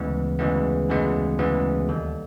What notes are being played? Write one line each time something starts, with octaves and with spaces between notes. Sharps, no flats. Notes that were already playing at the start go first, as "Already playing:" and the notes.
Already playing: D2 C#3 E3 G#3 B3
D2 C#3 E3 G#3 B3
D2 C#3 E3 G#3 B3
D2 C#3 E3 G#3 B3
D#2 D3 G3